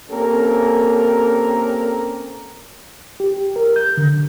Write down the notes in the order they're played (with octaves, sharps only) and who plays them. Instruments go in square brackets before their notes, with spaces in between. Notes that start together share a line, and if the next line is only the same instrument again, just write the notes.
[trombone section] A#3 C4 C#4 G4 A4 A#4
[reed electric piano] G4
A#4
G6
D3